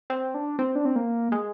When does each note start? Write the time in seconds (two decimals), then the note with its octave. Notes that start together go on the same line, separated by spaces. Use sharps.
0.10 C4
0.34 D4
0.59 C4
0.75 D4
0.85 C4
0.96 A#3
1.32 G#3